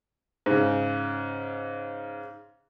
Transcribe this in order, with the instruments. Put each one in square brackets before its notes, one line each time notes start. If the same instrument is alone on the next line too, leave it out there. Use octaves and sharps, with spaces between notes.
[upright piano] G#2 C#3